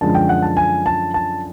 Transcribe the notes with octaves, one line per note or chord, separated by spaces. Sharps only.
F#2 D3 F3 G#3 A5
G5
F#5
A5
G#5
A5
A5